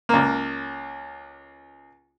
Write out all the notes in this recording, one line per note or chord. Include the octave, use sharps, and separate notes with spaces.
C#2 A#3